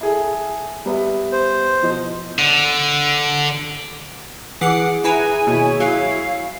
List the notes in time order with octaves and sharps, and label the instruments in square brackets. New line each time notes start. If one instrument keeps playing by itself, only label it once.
[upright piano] E4 G#4 A4
G3 B3 E5
[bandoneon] C5
[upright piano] B2 F3 D#5
[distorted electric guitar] D3
[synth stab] E3 D6 C7 [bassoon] G#4 [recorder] F#5
[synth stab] E4 B4 A#5 [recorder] G#5
[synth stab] D#2 B2 [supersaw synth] E4 C#5
[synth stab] F#3 [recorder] F5